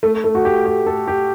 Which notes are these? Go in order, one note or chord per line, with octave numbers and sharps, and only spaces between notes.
A3
A3
F#4
G4
G4
A4
G4